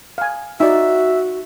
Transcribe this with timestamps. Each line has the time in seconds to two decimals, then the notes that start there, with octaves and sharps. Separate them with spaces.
0.18 F5 G#5
0.60 D#4 F#4 D5 E5